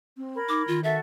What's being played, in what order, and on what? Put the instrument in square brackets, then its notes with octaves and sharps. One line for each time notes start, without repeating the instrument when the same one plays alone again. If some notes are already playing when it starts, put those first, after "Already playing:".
[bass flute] C4
[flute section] A#4 B5 G#6
[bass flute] D#4 [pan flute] D6
[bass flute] D#3 [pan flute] F4
[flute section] F#4 A4 F#5 [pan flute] E5